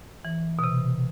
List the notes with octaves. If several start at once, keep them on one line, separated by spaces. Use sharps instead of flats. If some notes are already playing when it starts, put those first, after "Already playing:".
E3
B2
C3